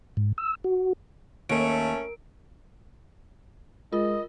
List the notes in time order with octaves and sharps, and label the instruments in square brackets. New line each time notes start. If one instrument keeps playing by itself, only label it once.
[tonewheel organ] G#2
E6
F#4
[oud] D#2 [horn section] A3 C#4 [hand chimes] A#4 D7
[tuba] G#3 [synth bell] F4 A#4 [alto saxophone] D#5